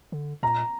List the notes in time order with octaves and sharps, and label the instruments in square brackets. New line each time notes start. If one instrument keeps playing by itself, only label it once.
[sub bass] D3
[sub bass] A#2 [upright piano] A#5